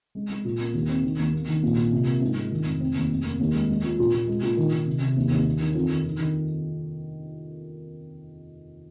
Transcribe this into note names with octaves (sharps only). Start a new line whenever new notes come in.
G#3
G#3
A#2
A#3
D#2
C4
D#3
D#2
A#3
D#3
A#1
A#2
C3
A#3
G#2
G#3
D#3
F1
C4
D#2
F1
A#3
D#2
G#3
G#3
F3
A#2
A#2
G#3
A#2
D#3
D#3
C3
C3
D#2
D#2
A#3
D#3
F2
D#3
D#3
D#3